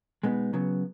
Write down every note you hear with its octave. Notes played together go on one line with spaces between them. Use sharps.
B2 G#3 B3 D#4
C#3 F#3 B3